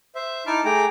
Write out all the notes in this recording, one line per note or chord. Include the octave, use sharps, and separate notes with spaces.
C5 E5
D#4 E4 A5 D6 F6
A3 G#4 G5 A#5 D6